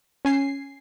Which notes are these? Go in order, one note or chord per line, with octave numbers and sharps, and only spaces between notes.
C#4 G#5 C7